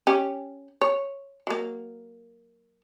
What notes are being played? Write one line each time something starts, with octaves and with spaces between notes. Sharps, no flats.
C#4 G4
C#5
F#3 A#3